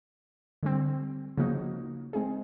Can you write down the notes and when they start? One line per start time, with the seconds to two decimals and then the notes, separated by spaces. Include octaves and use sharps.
0.63 D3 G3 C4
1.37 C#3 F3 A#3 D#4 F#4
2.13 G#3 C4 D#4 G#4